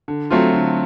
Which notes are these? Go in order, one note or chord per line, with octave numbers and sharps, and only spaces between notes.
D3
F#3 A3 C4 F4
D3